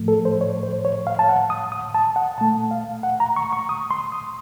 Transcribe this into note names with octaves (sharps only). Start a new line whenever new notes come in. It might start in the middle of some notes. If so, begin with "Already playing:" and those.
Already playing: A2 F3 A3
A4
C5
C#5
C5
C#5
F5
A5
F#5
D#6
D#6
A5
F#5
A#2 A3 A5
F5
F#5
A#5
C#6
C#6
D#6
C6
D#6